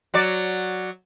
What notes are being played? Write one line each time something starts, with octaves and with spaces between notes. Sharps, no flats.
F#3 F#4 D5